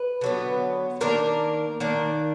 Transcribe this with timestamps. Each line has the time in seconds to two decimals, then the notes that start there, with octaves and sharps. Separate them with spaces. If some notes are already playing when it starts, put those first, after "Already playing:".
Already playing: B4
0.21 D3 F#3 B3
1.01 D#3 A#3 D4 A#4
1.80 D#3 A#3 D4